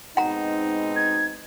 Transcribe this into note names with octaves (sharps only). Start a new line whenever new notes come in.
G#2 B2 C4 D#4 F#5 A#5
G#6